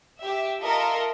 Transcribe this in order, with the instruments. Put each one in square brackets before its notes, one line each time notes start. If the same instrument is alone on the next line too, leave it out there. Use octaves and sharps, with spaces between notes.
[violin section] G4 E5
F4 A4 A#4 D#5 E5